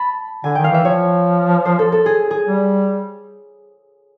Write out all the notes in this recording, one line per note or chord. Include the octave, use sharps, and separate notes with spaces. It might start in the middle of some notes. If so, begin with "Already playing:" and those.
Already playing: A5 B5
D3 G#5
D#3 G5
F5
E3 E5
F3 C#5
C5
A4
A4
G#4
G#4
G3